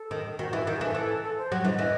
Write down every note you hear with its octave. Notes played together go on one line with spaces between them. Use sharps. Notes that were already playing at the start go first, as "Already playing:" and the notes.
Already playing: A4
D#3
D#3 F#4
E3 E4
D#3 F#4
G#4
E3
A4
E3
A4
C5
F#3 C#5
E3 D#5
E3